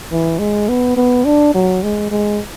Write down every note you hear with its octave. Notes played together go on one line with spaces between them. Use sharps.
E3
G#3
B3
B3
D4
F#3
G#3
G#3